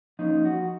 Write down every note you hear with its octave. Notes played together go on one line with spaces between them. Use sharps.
F3 A#3 C#4 D#4
F#4